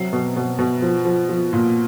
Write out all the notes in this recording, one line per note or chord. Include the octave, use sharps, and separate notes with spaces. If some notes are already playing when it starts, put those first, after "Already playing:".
Already playing: C3 F#3 C7
B2
B2
B2
F3
F3
F3
A#2